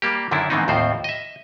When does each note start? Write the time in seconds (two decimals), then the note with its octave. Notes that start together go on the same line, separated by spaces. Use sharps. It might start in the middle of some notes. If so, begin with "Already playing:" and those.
0.02 G3 A#3 G4
0.31 F#2 D3 D#3 C#4 D4 E4
0.50 G#2 D#3 E3 B3 C4 D#4
0.68 D#2 A2 F3 C4 C5
1.04 D#5 E5